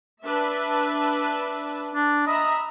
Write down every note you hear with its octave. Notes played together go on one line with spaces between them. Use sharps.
D4 B4 E5
D4
D#5 E5 A#5 B5